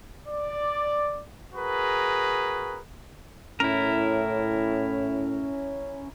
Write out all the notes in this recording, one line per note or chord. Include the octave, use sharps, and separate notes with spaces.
D5
F#4 G#4 A#4 B4
A2 C#4 E4 A#4